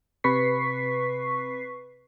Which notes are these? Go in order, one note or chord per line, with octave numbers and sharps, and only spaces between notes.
C3 B4 C#6 B6 C7